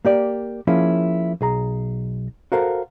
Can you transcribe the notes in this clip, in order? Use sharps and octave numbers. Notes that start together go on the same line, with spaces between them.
A#3 G4 D5
F3 A#3 C#4 E4 G#4
B1 G#4 A#5
F#4 A4 A#4 C5 F5